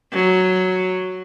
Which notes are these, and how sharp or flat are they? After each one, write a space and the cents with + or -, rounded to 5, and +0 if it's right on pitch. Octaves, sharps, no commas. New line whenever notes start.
F#3 +0